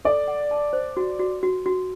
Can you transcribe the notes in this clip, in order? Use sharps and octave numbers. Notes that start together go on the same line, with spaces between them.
A4 D5
F#5
A5
C5
F#4
F#4
F#4
F#4